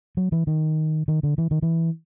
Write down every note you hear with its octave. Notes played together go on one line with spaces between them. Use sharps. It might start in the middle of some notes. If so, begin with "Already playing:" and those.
F#3
E3
D#3
D#3
D3
E3
D#3
E3